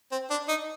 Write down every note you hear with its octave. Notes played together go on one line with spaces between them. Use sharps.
C4
D4
D#4